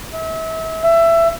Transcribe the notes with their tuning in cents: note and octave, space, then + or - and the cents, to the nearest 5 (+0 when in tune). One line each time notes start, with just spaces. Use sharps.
E5 -35
E5 +20